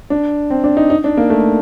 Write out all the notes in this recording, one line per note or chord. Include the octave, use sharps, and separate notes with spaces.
D4
C4
D4
D#4
D#4
D4
A#3
A3